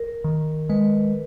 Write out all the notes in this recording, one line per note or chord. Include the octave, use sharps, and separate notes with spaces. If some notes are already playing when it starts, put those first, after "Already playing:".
Already playing: A#4
D#3
G#3 B4